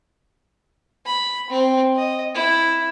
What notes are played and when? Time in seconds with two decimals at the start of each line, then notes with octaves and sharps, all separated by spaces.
1.06 B5
1.50 C4
1.96 D#5
2.34 E4